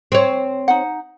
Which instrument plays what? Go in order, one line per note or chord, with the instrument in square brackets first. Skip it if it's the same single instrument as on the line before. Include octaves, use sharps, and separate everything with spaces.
[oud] C4 C#5
[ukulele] D#4 F#5